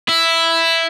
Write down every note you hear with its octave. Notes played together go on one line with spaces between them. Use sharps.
E4